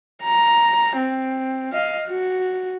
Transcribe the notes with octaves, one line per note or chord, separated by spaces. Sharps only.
A#5
C4
D#5 F5
F#4